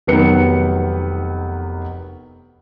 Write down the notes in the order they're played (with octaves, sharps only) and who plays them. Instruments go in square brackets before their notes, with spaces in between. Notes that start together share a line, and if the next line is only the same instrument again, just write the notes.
[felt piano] F1 D#3 F#3 B3 B4 C#7